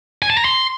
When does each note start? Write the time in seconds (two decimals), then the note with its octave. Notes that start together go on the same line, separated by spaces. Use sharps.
0.22 G#5
0.30 A5
0.37 A#5
0.45 C6